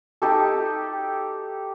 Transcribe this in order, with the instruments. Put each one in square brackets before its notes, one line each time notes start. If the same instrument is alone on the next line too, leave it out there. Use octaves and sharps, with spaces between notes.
[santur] D#4 G4 A4